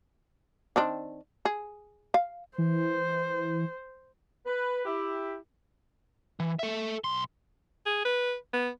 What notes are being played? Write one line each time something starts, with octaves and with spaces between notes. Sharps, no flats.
D#3 C4 D4
G#4
F5
E3 C5
B4
E4 G4
E3
A4 E5
B1 C6
G#4
B4
B3